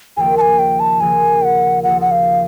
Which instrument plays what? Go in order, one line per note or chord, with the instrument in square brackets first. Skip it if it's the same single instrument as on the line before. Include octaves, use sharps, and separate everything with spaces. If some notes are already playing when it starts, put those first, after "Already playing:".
[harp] D#2 C#3 F3 A#3 [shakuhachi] G5 G#5
[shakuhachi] A5
G#5
G5
A5
[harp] D#2 C#3 F3 A#3 [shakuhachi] G#5
[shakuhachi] G5
F#5
[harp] D#2 C#3 F3 A#3 [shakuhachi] F#5
[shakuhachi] F#5
F5